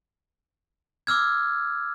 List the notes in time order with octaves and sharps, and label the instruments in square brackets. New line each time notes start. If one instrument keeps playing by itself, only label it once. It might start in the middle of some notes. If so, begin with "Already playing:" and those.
[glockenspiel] D6 E6 F6 G#6